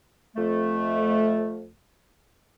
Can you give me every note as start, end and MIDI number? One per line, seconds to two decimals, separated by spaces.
0.36 1.70 41
0.36 1.70 57